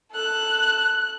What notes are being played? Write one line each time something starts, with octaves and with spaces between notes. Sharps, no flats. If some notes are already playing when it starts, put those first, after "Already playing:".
A4 F#6